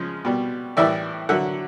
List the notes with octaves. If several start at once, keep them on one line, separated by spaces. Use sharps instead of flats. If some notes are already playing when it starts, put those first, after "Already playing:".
Already playing: C#3 F3 G#3
B2 G3
A2 E3 G3 D5 E5
D3 F#3 E5 F#5